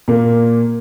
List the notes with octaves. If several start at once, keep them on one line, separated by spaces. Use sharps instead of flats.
A#2 A#3